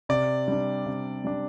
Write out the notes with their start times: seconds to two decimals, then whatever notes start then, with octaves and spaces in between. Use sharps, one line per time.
0.09 C3 D5
0.48 G3 D4
0.86 C3
1.25 G3 D4